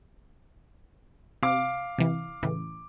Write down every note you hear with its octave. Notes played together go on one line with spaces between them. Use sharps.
C3 F5 D6
C3 E3
A2 C#3 E3